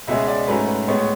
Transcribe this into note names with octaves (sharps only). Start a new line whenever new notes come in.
C#2 B2 G#3 C#4 E5
D5
G#2 F#3 A3 C#4 B4
B4
A2 G#3 B3 C#5